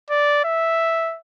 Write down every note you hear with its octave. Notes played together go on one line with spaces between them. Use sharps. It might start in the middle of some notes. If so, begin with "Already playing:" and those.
D5
E5